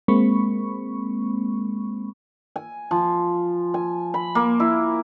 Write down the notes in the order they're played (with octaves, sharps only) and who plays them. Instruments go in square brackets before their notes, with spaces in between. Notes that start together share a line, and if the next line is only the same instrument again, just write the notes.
[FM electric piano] G#3 A#3 C4 B5 C#6
[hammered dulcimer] G#5
F3
G#5
B5
A#3
E4